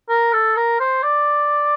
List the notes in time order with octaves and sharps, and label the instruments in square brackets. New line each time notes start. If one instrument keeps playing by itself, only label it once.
[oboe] A#4
A4
A#4
C5
D5